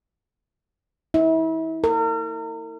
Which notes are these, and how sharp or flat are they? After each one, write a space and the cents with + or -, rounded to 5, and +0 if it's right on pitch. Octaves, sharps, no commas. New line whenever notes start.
E4 -35
A#4 -40